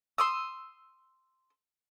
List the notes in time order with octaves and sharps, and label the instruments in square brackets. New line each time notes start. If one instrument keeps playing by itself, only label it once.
[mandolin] C6 D#6 E6